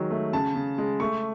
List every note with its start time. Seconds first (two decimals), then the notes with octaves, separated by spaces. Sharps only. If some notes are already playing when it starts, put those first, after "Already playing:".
Already playing: D#3 F#3 G#3
0.11 A3
0.33 C#3 A5
0.55 C#3
0.78 G#3
1.00 A3 C#6